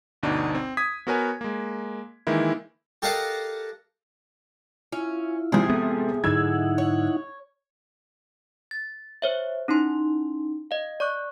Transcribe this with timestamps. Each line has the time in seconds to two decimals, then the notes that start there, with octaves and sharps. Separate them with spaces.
0.23 G1 D2 B2 D4 D#4
0.55 C4
0.77 D#6 G#6 B6
1.07 B3 F#4 A#4 B4 C#5 G#5
1.41 G#3 A#3
2.27 D#3 E3 G#3 A#3 E4
3.02 G4 A4 A#4 D#5 F5 F#5
4.92 C#4 E4 F4
5.52 A2 C3 F3 G#4
5.70 G#3 B3 A4
6.24 G#2 D3 F#3 D#4 E4 F#5 E6 G#6
6.78 C#5
8.71 A6
9.22 C5 C#5 E5
9.68 C#4 D#4 E4 C6
10.71 D#5 F5
11.00 D5 C#6 D6 F#6